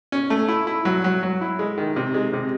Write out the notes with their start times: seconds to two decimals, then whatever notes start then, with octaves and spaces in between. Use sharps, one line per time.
0.12 C#4
0.30 A3
0.49 E4
0.67 E4
0.85 F#3
1.04 F#3
1.23 F#3
1.41 E4
1.59 G#3
1.78 D#3
1.96 C3
2.14 G#3
2.33 C3